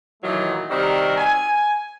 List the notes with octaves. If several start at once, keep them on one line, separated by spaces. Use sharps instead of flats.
A#2 D#3 E3 F#3 A3
C3 D#3 G3 C4 F#4 A#4
G#5